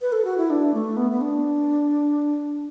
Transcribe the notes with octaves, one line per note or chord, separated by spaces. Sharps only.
B4
A4
F#4
E4
D4
A3
B3
B3
D4